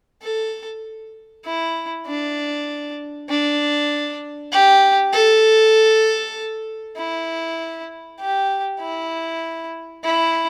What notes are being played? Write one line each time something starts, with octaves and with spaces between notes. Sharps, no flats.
A4
E4
D4
D4
G4
A4
E4
G4
E4
E4